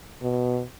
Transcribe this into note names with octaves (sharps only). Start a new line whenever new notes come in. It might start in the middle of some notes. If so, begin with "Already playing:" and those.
B2